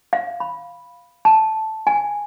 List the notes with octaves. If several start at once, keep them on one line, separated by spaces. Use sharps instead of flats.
F5
B5
A5
G#5